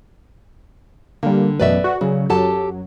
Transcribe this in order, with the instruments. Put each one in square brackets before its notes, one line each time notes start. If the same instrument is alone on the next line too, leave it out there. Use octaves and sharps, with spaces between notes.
[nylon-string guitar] D3 [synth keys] G3 A#3
[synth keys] A1 F#2 B2 [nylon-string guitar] B4 D5 E5
[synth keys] F#4
[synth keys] C#3 [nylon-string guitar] F#3
[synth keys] F#2 F#3 [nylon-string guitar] G4 A4 A5